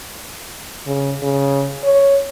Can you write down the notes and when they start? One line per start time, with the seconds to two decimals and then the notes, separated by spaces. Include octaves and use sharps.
0.86 C#3
1.22 C#3
1.84 C#5